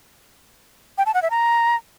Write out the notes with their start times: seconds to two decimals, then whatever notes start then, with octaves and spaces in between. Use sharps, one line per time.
0.98 G5
1.06 A5
1.14 F#5
1.22 E5
1.31 A#5